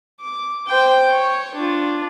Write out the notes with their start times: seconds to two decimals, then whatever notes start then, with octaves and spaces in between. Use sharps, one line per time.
0.20 D6
0.66 C5 G5
1.11 C#5
1.54 D4 F4